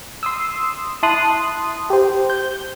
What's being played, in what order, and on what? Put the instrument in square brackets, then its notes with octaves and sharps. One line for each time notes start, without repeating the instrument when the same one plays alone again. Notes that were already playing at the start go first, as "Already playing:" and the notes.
[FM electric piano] C6 D#6 E6
E4 A5 C6 D#6 F#6
G4 C5
G6